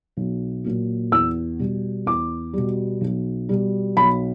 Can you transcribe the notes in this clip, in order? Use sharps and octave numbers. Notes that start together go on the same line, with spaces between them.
B1
A#2 F#3
E2 E6
B2 G3
E2 D6
B2 G3
B1
B2 G3
B1 B5